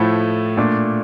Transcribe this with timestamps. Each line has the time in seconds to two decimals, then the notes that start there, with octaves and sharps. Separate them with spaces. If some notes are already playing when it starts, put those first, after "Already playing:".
Already playing: A2 F3 A3 E4
0.57 A#2 A3 D4